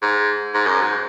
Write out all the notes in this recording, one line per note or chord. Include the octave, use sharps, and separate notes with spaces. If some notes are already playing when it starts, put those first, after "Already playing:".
G#2
G#2
F#2
G#2